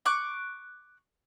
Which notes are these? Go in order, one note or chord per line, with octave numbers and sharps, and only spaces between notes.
C#6 D6 F#6